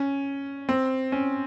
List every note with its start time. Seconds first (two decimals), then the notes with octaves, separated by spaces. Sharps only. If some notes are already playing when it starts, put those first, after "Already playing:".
Already playing: C#4
0.69 C4
1.12 C#4